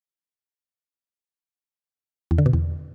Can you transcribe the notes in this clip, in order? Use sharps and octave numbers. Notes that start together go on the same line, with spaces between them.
E2
D3
B2
E2